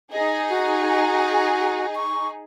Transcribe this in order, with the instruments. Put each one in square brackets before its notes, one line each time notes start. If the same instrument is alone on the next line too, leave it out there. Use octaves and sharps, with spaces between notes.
[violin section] D#4 G#4 [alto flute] D#5
[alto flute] F#4
C#6